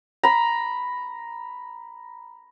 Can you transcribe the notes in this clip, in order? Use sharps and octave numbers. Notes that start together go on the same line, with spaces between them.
A#5 B5